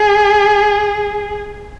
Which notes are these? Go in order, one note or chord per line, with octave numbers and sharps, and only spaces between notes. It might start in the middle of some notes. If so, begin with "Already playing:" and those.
Already playing: G#4